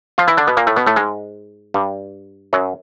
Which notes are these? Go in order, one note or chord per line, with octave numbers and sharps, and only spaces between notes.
F3 F4
E3 E4
D3 D4
B2 B3
A#2 A#3
A2 A3
B2 B3
A2 A3
G#2 G#3
G2 G3
F#2 F#3